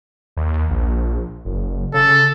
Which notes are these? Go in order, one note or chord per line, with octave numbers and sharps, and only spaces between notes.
D#2
A#1
F#1
C#3 A4